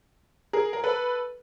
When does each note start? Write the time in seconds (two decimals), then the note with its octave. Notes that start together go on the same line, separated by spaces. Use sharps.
0.53 G#4 A#4
0.73 A#4
0.84 A4 B4